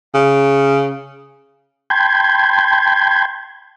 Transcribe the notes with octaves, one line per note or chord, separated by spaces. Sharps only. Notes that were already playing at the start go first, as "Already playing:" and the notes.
C#3
G5 A5 B5 C6 G6 G#6